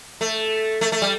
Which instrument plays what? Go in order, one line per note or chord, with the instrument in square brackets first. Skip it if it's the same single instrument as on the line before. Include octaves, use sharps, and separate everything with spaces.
[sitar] A3
A3
A3
G3